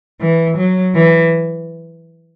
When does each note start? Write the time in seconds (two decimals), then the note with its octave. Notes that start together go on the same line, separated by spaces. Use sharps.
0.21 E3
0.57 F#3
0.94 E3